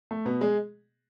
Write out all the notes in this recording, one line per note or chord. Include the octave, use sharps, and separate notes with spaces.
A3
B2 B3
G#3 G#4